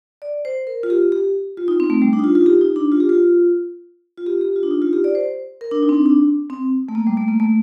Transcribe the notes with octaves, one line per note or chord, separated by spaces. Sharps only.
D5
C5
A#4
F4
G4
G4
F4
D#4
C4
A3
G3
D4
D#4
F4
F4
G4
D#4
D4
F4
G4
F4
F4
G4
G4
F4
D4
D#4
F4
G4
D5
C5
A#4
D4
D#4
C4
D4
D4
C4
A3
A#3
G3
A3
A#3
A3